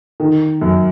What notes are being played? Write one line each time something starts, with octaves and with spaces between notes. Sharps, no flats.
D#3
F#2